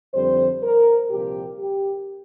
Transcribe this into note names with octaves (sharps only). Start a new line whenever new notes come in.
F2 D3 G3 C5
A#4
C2 A#2 F3 G4
G4